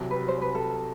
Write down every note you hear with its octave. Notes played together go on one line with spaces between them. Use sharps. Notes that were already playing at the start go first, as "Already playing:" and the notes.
Already playing: C2 C3 F#3
B4
C5
B4
A4